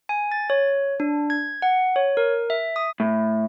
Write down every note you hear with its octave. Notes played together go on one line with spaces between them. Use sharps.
G#5
A6
C#5
D4
G#6
F#5
C#5
A#4
E5
D#6
A2